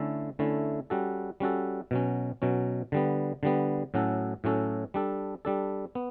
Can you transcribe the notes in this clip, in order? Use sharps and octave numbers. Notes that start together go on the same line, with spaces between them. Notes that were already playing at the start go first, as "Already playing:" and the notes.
Already playing: D3 A3 C#4 E4 A4
D3 A3 C#4 E4 A4
G3 C#4 F#4 A4
G3 C#4 F#4 A4
B2 F#3 C#4
B2 F#3 C#4
D3 G3 B3
D3 G3 B3
A2 F#3 C#4 F#4 A4
A2 F#3 C#4 F#4 A4
G3 D4 A4
G3 D4 A4
B3